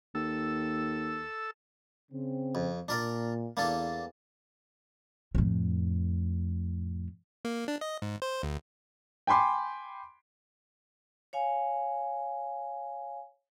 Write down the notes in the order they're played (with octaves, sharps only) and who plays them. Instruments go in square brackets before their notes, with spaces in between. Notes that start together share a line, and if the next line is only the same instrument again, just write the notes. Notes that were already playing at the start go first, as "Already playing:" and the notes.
[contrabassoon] D#2 [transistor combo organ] A4 E6
[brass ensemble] C#3 C4
[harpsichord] F2
[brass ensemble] A#2 [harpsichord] D4 A#4 D5
[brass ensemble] E2 [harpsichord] A#3 D4 A4
[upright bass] F2 A2
[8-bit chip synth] A#3
D4
D#5
G#2
C5
D2
[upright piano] G5 G#5 B5 C6 D6
[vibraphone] C#5 F5 G#5